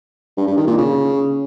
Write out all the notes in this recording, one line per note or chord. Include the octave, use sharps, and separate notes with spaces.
G2
G2
D#3
A#2
C#3